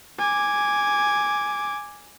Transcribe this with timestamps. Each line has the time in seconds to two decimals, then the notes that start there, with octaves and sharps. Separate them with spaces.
0.19 G#5 D6